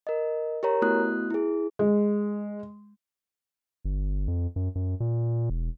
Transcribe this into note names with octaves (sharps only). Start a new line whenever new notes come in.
A#4 D#5
G4 A#4 C#5 A#5
A3 B3 E4 F#4 D#6 F#6
E4 G#4
G#3
G1
F2
F#2
F#2
A#2
E1